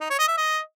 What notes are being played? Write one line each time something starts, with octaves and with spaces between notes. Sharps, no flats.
D#4
C#5
D#5
E5
D#5